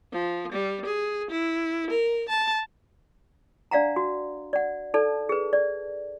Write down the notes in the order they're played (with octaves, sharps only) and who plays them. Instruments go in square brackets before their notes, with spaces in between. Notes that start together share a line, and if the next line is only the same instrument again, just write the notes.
[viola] F3
G3
G#4
E4
A#4
A5
[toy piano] D4 D5 F5 F#5 A#5
F#4
D5 F#5
D#4 A4 D5 A5
G#4 B4
D5